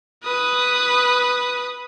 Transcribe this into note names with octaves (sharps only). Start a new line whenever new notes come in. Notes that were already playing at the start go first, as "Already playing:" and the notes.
B4 D#6